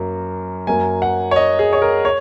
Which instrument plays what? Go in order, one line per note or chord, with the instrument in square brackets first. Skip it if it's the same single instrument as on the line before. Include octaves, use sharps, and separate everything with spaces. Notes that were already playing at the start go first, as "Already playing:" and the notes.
Already playing: [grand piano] F#2 F#3 A#3
F#2 F#3 A#3 G#5
F#5
C#5
D#5
G#4
C#5
A#4
C#5